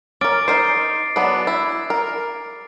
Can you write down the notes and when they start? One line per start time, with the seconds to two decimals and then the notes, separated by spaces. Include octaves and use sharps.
0.21 C#4 A#4 D6 A6 D7
0.48 D#4 A#4 C5 C7 D7
1.16 F#3 B3 D4
1.47 E4
1.90 A#4